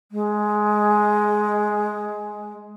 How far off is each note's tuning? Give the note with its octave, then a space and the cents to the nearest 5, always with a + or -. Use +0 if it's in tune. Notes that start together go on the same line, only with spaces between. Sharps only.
G#3 +10